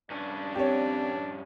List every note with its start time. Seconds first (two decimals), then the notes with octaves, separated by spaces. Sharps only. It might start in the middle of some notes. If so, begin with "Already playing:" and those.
0.10 G2 C#4 D4
0.55 C4 D4 G4 C#5